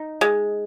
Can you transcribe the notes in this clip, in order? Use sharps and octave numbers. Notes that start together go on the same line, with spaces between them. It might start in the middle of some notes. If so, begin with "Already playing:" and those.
Already playing: D#4
G#3